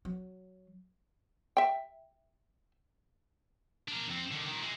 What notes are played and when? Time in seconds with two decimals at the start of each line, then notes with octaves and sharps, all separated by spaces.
0.05 F#3
1.57 E5 G5
3.88 D4 A#4
4.10 F2 C4
4.31 D3 D#3
4.47 A#2 D#3
4.62 G#3 E4